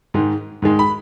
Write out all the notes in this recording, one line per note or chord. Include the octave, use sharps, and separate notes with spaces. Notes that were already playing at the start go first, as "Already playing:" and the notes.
G#2 D#3 G#3
G#2 D#3 G#3
B5